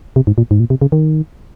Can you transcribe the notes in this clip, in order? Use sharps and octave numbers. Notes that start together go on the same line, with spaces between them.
C3
G#2
A#2
G#2
A#2
C3
C#3
D#3